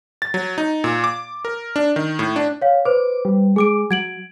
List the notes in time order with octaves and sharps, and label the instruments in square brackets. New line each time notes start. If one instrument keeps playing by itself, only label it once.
[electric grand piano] A6
F#3
D#4
A#2
D6
A#4
D4
D#3
A2
D4
[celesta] C#5 F5
[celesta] B4 C5 [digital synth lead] D6
[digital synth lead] G3
[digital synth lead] G#3 [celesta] G#4 D6 D7
[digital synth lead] F#3 [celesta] G#6 D7 F#7